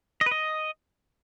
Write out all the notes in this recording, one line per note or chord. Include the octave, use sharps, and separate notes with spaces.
D#5
B4
D#5